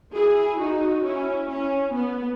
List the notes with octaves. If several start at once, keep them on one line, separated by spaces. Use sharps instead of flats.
E4 G#4
D#4 F#4
C#4 E4
C#4
B3